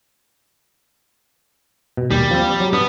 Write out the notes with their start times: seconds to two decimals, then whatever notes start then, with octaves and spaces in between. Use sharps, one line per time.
1.97 B2
2.11 D#2 G3
2.31 F3 C4
2.60 F#3
2.73 B3 D4